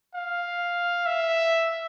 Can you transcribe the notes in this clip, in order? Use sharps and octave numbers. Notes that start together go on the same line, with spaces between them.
F5
E5